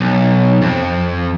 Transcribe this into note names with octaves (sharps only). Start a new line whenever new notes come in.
B1
F2